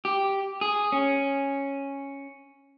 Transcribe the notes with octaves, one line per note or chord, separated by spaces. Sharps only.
G4
G#4
C#4